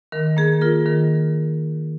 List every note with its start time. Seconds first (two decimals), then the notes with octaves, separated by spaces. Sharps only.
0.12 D#3 A#4
0.37 A#3 G#4
0.61 F4 A#4
0.86 D#3 A#4